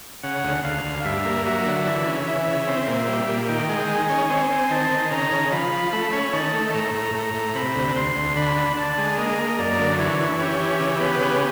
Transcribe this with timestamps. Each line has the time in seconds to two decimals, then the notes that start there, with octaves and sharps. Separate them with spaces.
0.23 C#3 F#5
0.44 D2
0.63 D2 F5
0.84 D2
1.04 G2 E5
1.25 A#3
1.45 F#3 E5
1.66 D3
1.86 E3
2.06 C#3
2.27 E3 E5
2.47 C#3
2.67 C4
2.88 A#2
3.08 G3
3.28 A#2
3.48 D#3 G5
3.69 G#3
3.89 D#3 G#5
4.10 C#4
4.29 C4 G#5
4.50 C4
4.71 D#3 A5
4.91 D#3
5.11 C#3 A#5
5.32 C#3
5.51 F3 B5
5.73 F3
5.92 A3 B5
6.13 C#4
6.33 D#3 A5
6.53 A3
6.74 A2 A#5
6.94 A2
7.14 A2 A#5
7.34 A2
7.55 C3 B5
7.76 D2
7.96 D2 C6
8.16 D2
8.36 D3 B5
8.56 D3
8.76 D3 A5
8.98 G#3
9.18 A#3 D#5
9.38 A#3
9.58 F#2 D5
9.79 D3
9.99 E3 C#5
10.19 E3
10.39 C#4 G4
10.60 E3
10.80 C#3 G4
11.00 B3
11.21 C#3